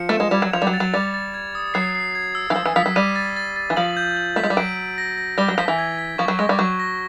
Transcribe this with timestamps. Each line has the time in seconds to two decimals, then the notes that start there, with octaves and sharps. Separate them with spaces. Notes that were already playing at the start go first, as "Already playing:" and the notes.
Already playing: F3 C#7
0.09 A3 E7
0.20 G#3
0.31 G3 G#6
0.42 F#3
0.53 F3 F7
0.62 G3
0.67 F#3
0.73 A6
0.80 F#3
0.93 G3 A6
1.14 A6
1.34 G#6
1.55 D#6
1.74 F#3 C7
1.95 C7
2.15 G#6
2.35 E6
2.50 E3
2.55 F3 E6
2.66 E3
2.76 F3 B6
2.86 F#3
2.96 G3 D#7
3.15 A6
3.37 A6
3.56 A6
3.70 E3
3.76 F3 F#7
3.97 G6
4.17 F#7
4.36 A3 B6
4.43 G#3
4.50 G3
4.57 F#3 D7
4.77 D7
4.98 A#6
5.18 A#6
5.38 G3 G7
5.48 F#3
5.58 F3 B6
5.68 E3
5.78 G#6
5.99 B6
6.18 F3 C#6
6.28 F#3
6.39 G#3 A#6
6.49 G3
6.59 F#3 C#6
6.80 A#6